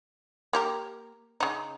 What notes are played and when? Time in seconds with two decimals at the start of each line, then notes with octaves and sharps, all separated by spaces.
0.53 A#3 G4 A#4
1.40 C#3 D#4